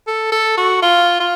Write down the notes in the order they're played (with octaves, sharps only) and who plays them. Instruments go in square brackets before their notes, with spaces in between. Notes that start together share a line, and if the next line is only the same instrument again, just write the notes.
[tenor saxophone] A4
A4
F#4
F4
F4